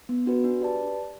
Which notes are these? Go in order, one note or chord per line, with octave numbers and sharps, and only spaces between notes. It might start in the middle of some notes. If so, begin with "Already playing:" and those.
B3
D4 F#4 B4
D4
G4 B4 D5 A5